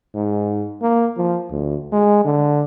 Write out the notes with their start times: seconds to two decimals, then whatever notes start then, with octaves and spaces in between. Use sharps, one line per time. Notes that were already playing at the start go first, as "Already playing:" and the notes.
0.14 G#2
0.82 A#3
1.17 F3
1.51 D2
1.92 G#3
2.25 D3